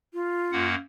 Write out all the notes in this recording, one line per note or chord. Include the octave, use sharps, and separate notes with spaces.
F4
F#2 A#3 F#5